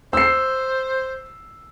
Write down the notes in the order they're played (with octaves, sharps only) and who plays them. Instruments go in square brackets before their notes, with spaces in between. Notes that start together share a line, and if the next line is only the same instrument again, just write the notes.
[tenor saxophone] C5 [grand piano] E6 C7